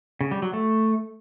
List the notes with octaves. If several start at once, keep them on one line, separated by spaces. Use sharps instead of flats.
C#3
G3
F#3
A3